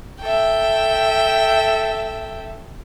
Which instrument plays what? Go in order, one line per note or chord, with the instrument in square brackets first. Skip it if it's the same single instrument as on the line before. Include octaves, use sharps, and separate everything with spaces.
[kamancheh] A4 E5 [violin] G5